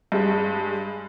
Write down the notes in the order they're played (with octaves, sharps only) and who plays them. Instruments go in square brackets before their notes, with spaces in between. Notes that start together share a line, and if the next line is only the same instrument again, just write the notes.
[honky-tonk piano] G2 G#3